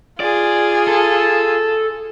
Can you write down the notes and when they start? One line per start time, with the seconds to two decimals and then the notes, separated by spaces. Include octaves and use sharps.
0.20 F4 G#4 D5
0.87 A4